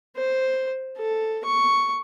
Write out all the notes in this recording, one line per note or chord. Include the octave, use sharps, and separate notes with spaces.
C5
A4
C#6